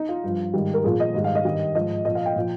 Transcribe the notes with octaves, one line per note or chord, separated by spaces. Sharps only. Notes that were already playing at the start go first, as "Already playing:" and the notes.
Already playing: D#4
F4
G2 F3
G#2 D#3 G3
A#4
A#2 F3 G#4
D#5
G#2 D#3 G3
F5
D#5
G2 D#3 G3
G#2 F3 D#5
A#2 F3 D#5
F5
G5
A#2 F3